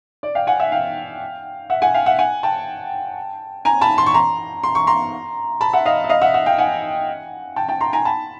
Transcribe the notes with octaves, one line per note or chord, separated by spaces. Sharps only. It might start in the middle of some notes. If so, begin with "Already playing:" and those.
D5
F5 G5
F#5 G#5
E5 F#5
F5 G5
E5 F#5
F#5 G#5
F5 G5
E5 F#5
F#5 G#5
G5 A5
G#5 A#5
A5 B5
C6
C#6
A#5 C6
C6
C#6
A#5 C6
A5 B5
E5 F#5
D#5 F5
E5
D#5 F5
E5 F#5
E5 F#5
F5 G5
F#5 G#5
G5 A5
G5 A5
A#5 C6
G#5 A#5
A5 B5